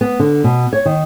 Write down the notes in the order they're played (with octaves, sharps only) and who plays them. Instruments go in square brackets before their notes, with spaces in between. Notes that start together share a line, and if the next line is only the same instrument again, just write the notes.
[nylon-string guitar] B3
D3
B2
C#5
D#3